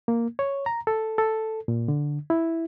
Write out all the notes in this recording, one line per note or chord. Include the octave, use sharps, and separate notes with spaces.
A#3
C#5
A#5
A4
A4
A#2
D3
E4